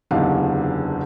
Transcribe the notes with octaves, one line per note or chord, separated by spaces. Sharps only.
F#1 E2 D3 D#4 G4 F5